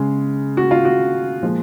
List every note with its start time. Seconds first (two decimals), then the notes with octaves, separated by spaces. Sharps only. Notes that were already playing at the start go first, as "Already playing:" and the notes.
Already playing: C#3 G#3
0.57 F#4
0.71 F4
0.85 F#4
1.42 A#2 F3 G#3